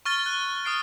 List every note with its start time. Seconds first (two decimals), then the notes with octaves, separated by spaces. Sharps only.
0.05 C#6 F6 A6 G7
0.26 F#6
0.65 D#6 F6 C7 D7